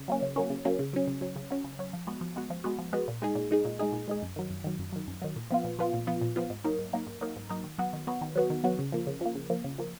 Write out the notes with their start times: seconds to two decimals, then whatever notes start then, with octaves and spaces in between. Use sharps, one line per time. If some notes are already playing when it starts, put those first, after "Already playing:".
Already playing: C#3
0.08 F#3 A#3 C#4
0.22 C#3
0.36 F#3 A#3 C#4
0.50 C#3
0.65 F#3 A#3 C#4
0.79 C#3
0.93 F#3 C#4
1.08 C#3
1.21 F#3 C#4
1.36 C#3
1.50 F#3 C#4
1.64 C#3
1.79 F#3 C#4
1.93 F3
2.07 G#3 B3 F#4
2.21 F3
2.36 G#3 B3 F#4
2.50 F3
2.64 G#3 B3 F#4
2.79 F3
2.93 G#3 B3 F#4
3.08 A#2
3.22 G#3 D#4 G#4
3.35 A#2
3.51 G#3 D#4 G#4
3.65 A#2
3.79 G#3 D#4 G#4
3.92 A#2
4.08 G#3 D#4 G#4
4.22 F#2
4.36 D#3 F#3
4.50 F#2
4.64 D#3 F#3
4.79 F#2
4.92 D#3 F#3
5.08 F#2
5.22 D#3 F#3
5.36 A#2
5.50 F3 B3 F4
5.65 A#2
5.79 F3 B3 F4
5.93 A#2
6.07 F3 B3 F4
6.21 A#2
6.36 F3 B3 F4
6.50 G#2
6.64 F#3 A#3 D#4 A#4
6.79 G#2
6.93 F#3 A#3 D#4 A#4
7.07 G#2
7.21 F#3 A#3 D#4 A#4
7.36 G#2
7.49 F#3 A#3 D#4 A#4
7.64 D#3
7.78 F#3 B3 F#4
7.93 D#3
8.07 F#3 B3 F#4
8.21 D#3
8.36 F#3 B3 F#4
8.50 D#3
8.64 F#3 B3 F#4
8.79 C#3
8.92 F3 A#3
9.07 C#3
9.21 F3 A#3
9.35 C#3
9.50 F3 A#3
9.64 C#3
9.78 F3 A#3